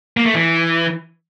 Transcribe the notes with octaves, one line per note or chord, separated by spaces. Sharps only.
A#3
A3
E3